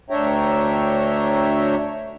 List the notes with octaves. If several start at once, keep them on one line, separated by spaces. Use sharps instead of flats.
D2 D4 C#5 E5 G5 A#5